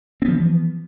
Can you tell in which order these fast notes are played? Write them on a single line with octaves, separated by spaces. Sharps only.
C4 B3 F3 E3